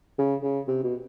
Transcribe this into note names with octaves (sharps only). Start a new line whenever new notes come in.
C#3
C#3
C3
B2